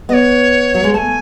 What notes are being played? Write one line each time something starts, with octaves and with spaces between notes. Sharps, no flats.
B3 C#5 D#5
F#3
G#3
A3 G#5 A5